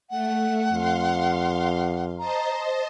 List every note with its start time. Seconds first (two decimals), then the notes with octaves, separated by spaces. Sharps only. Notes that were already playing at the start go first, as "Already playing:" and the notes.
0.10 A3 F#5
0.72 F2 F5 C6
2.19 C5 D#5 A5 A#5